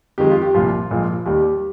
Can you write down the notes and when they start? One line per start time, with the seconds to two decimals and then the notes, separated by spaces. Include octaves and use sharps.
0.18 F2 D#3 G#3 G4
0.30 F4
0.42 G4
0.54 C2 A#2 F3 F4
0.91 A#1 A#2 F3 G#3
1.26 D#2 D#3 G3 G4